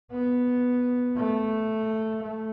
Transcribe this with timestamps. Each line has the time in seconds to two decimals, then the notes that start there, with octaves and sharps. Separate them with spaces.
0.12 B3
1.17 A3
2.22 A3